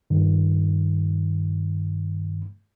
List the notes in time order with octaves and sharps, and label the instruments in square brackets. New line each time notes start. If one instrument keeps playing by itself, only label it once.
[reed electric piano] G2 D#3